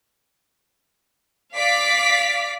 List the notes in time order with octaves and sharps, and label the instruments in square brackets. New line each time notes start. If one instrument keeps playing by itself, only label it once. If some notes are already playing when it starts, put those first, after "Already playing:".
[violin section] D5 F5 D6 B6